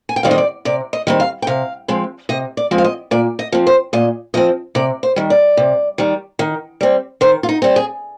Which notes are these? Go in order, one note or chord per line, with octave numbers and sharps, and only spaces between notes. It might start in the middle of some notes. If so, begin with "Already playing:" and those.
G#5
G5
D#3 G3 C4 F5
D#5
D5
C3 D5
D#5
D#3 G3 C4
F5
G5
C3 F5
F3 G#3 C4
C3 D#5
D5
F3 G#3 C4
F5
D#5
A#2 D5
D#5
F3 C4
C5
A#2 D#5
F3 C4 D#5
C3 D5
C5
D#3 G3
D5
C3
D#3 G3
D#3
G3 C4
D#3 C5
F4
D#4
G3 C4
G#4